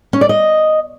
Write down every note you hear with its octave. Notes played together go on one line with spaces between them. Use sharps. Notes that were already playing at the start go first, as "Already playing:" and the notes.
C#4
D5
D#5